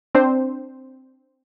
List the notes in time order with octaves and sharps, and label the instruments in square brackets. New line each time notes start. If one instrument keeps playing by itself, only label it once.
[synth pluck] C4 D4 C5